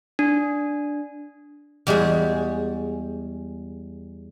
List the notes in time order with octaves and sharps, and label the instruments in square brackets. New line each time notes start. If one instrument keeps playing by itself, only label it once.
[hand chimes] D4
[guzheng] E2 G3 G#3 F#4 G#4